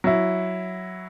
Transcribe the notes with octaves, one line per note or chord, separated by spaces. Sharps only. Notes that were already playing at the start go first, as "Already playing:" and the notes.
F#3 E4